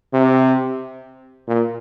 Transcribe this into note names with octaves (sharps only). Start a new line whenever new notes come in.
C3
A#2